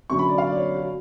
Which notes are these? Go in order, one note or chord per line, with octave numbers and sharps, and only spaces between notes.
F#2 D3 F#3 C#4 C#6
B5
D5
F5
D5
C#5
F#4